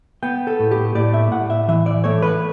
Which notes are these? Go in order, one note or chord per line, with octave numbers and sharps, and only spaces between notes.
B3 G5
A4
A2
G4
A2 D5
E5
A2 F#5
E5
E3 E5
D5
A3 C#5
B4